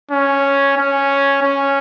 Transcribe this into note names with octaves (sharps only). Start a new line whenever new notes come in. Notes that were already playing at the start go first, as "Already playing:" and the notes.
C#4
C#4
C#4